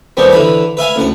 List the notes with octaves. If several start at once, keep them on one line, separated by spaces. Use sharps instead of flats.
D#2 A#2 G3 B3 C4
D3 E3 B5
B4 E5 F5 G#5
A1 D2 F#5